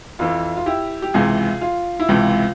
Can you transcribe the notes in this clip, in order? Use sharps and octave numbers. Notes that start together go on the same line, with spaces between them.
F2 E3 F4
F4
E4 G4
G4
C#2 C3 E3 F4 G#4
F4
E4
C#2 C3 E3 F4